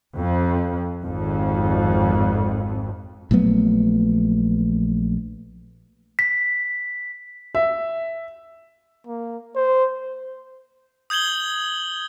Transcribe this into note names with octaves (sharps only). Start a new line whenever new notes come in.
F2
G#1 F2
A#1 F#3 A3 B3
B6
E5
A#3
C5
D#6 G6 G#6 F#7 G7